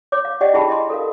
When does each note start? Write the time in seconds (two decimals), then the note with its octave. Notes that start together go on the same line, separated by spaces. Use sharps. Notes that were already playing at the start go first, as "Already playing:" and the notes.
0.12 C#5 D6
0.25 F5
0.41 G4 D5 D#5 F#5 G5
0.54 E4 G4 G#4 G5 A5 B5
0.68 E4 D#5 C6
0.90 A4 A#4 F5